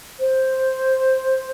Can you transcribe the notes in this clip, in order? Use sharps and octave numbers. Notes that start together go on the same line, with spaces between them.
C5